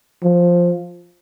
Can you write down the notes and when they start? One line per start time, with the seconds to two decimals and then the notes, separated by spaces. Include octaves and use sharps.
0.23 F3